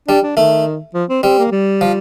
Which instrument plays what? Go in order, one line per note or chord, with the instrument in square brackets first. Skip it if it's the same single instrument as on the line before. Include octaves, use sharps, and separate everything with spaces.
[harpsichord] G3 [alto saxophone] D4
[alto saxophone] D4
[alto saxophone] D#3 [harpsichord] A3
[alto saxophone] F3
C4
[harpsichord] G3 [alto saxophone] C4
[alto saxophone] A#3
G3
[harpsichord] F3